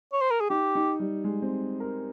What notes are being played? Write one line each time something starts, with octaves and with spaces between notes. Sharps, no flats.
C#5
C5
A#4
G#4
D#4 G4
D#4
G3
G#3
C4
A#4